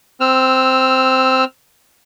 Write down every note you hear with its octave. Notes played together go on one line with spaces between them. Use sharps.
C4 E6 F6